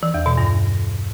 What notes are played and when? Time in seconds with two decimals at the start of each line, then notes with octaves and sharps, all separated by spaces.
0.03 E3
0.14 E2
0.26 B2
0.38 G2